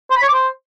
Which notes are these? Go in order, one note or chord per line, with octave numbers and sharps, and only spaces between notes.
C5
B5
C#5
D6
C5